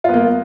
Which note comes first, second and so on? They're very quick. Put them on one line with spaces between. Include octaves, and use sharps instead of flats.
F4 B3 A#3